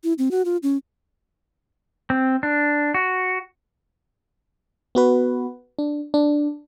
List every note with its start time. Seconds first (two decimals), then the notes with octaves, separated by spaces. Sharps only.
0.04 E4
0.18 C4
0.31 F#4
0.45 F4
0.63 C#4
2.10 C4
2.43 D4
2.94 F#4
4.95 B3 F#4 B4
5.79 D4
6.14 D4